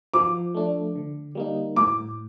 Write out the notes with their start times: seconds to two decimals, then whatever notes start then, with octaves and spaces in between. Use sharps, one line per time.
0.14 F3 D6
0.54 A3 D4
0.95 D3
1.35 G3 A#3 D#4
1.76 A2 D6